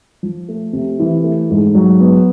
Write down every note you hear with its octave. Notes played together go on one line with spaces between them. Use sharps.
F3
A3
C3
E3
A3
G#2
F#3
B3